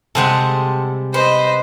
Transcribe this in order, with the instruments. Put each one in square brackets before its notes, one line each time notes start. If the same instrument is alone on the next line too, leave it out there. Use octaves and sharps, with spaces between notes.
[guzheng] C3 G3 G#3 [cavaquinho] A4 C5 F#5
[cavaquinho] B4 [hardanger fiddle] C5 D#5